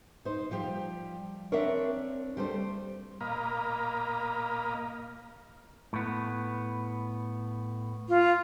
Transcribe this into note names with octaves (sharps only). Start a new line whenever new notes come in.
D#4 C5
F3 G3 G4
C4 D4 A#4 C#5 E5
G3 A3 C5
A#2 A#3 D#5 F5 A#5 B5
A2 B3
F4